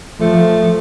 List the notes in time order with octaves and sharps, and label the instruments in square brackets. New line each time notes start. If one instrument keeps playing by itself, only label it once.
[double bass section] F3 [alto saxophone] A3